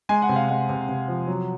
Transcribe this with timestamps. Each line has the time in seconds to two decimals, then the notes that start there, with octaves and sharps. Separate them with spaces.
0.09 G#3 G#5
0.22 F#5
0.29 C3
0.36 F5
0.49 G#3 F#5
0.69 C3
0.89 C3
1.08 F3
1.27 F#3